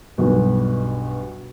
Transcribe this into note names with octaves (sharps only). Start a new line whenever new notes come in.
B1 G2 B2